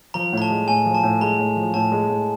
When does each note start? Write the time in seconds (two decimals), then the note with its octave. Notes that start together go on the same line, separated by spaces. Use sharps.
0.14 F3 A#5
0.33 A2 A#5
0.42 A5
0.50 G#3
0.68 A2 G#5
0.86 F3
0.95 A5
1.03 A2
1.21 G#3 A#5
1.39 A2
1.56 F3
1.74 A2 A5
1.92 G#3
2.10 A2